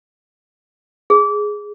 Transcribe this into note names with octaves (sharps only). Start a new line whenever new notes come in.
G#4